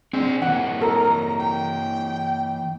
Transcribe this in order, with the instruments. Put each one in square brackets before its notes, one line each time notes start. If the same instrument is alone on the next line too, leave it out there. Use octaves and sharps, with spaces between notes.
[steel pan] C4 [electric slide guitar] D4 G#4
[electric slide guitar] E3 A#3 [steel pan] F#5
[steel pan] A4 A#4 [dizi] A#5
[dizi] G5